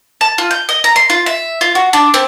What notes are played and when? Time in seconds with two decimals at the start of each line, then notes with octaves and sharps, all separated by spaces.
0.21 A5
0.38 F4
0.51 G6
0.69 D#5
0.84 A#5
0.96 C6
1.10 F4
1.26 E5
1.61 F4
1.75 F#4
1.93 D4
2.14 C4